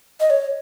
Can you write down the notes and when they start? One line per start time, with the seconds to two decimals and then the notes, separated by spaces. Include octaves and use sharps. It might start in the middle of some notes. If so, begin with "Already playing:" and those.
0.20 D#5
0.30 C#5